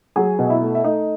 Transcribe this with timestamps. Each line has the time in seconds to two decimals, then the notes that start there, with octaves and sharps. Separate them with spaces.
0.16 F#3 G#4 G#5
0.39 B2
0.45 D#5
0.50 E4 E5
0.61 A3
0.75 E5
0.84 A3 D#4 D#5